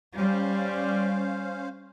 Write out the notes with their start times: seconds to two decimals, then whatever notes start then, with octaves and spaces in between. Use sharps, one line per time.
0.16 G3 C#4 C5 F5